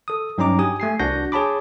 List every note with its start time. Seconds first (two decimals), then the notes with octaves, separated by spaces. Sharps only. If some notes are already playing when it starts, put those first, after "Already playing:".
0.08 A4 D#6
0.38 G2 F#3 C#4 D#4 A#5 D6
0.59 G4 G#5 D#6
0.80 A3 G#5 C7
0.99 C2 D4 F#4 F#5 G6 A#6
1.32 G#4 C#5 A5 B5 D6